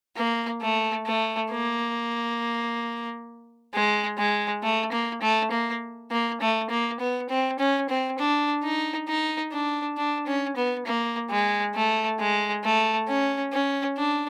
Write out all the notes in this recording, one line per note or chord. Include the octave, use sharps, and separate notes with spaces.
A#3
A3
A3
A#3
G#3
G#3
A3
A#3
A3
A#3
A#3
A3
A#3
B3
C4
C#4
C4
D4
D#4
D#4
D4
D4
C#4
B3
A#3
G#3
A3
G#3
A3
C#4
C#4
D4